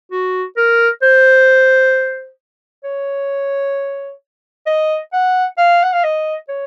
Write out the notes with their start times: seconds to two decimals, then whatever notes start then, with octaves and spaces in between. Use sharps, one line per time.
0.11 F#4
0.57 A#4
1.03 C5
2.84 C#5
4.67 D#5
5.13 F#5
5.58 F5
5.83 F#5
5.93 F5
6.04 D#5
6.49 C#5